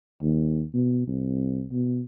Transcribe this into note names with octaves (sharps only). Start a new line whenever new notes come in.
D#2
B2
C2
B2